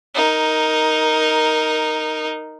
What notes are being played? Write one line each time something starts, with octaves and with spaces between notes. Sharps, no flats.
D#4 A#4